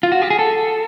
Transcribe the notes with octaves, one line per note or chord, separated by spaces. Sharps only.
F4
F#4
G4
G#4
A4